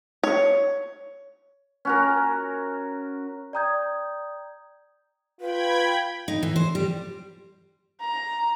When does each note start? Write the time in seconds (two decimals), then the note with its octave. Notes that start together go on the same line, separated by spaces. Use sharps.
0.24 C#5
1.85 C#4 F#4 A#4
3.53 D5 G5 A#5 D#6 G6 G#6
5.41 F4 B4 G5 B5 G#6
6.28 D#4
6.43 E3
6.56 C5
6.75 G3
8.01 A#5